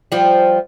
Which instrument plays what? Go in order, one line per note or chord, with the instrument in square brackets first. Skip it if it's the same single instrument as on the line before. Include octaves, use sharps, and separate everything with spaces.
[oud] F3 G3